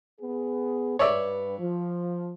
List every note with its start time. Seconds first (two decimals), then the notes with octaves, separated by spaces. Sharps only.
0.20 B3 G#4
0.99 G2 B4 C#5 D5 E5
1.59 F3